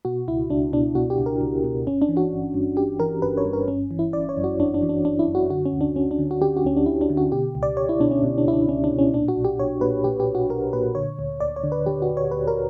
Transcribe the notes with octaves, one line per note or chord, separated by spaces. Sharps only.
B2 F#4
C#2 E4
C#2 D4
B2 D4
B2 F#4
G4
C#2
A#4
C#2
B2
G1 C#4
D4
E3
F#4
G1
G2
G1 G4
E3 A#4
G1 B4
C#5
G2
A#4
G1 C#4
E3
E4
G1 D5
C#5
F#2
F#4
G1 D4
D4
E3
D4
G1 D4
E4
F#2
F#4
D3 F#4
C#4
D2
D4
D2 C#4
D4
D3
F#4
D3 G4
F#4
D2 C#4
D4
D2 E4
D4
D3
F#4
B2 G4
C#2
D5
C#2 C#5
E4
B2 D4
C#4
B2
D4
C#2 E4
D4
C#2 C#4
D4
B2
C#4
A#2 D4
F#4
B1
G4
B1 C#5
A#2 B4
A#2 G4
G4
B1
F#4
B1 A#4
A#2 B4
D3 C#5
D2
D2 D5
C#5
D3
B4
D3 G4
F#4
D2
C#5
D2 B4
A#4